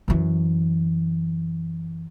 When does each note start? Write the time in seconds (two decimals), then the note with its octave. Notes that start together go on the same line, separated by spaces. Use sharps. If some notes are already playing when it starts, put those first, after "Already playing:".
0.08 F#2 E3